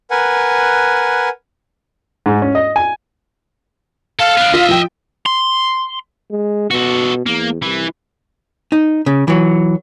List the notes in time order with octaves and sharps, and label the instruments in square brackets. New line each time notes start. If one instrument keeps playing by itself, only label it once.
[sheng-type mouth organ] A#4 B4 F#5 G#5
[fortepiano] G#2
C#4
D#5
G#5
[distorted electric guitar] A4 [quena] F5
[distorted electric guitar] B3 D4
[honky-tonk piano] F4 [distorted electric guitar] D#5 E5
[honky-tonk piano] F3 G5
[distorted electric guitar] C6
[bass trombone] G#3
[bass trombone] B2 [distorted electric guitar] F#4 A4
[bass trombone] E2 [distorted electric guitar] A#3
[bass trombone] C2 [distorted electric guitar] E3
[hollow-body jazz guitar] D#4
C#3
E3 F#3